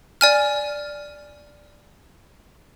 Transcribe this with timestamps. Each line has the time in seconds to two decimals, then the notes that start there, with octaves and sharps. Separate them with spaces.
0.21 D5 G#5 F6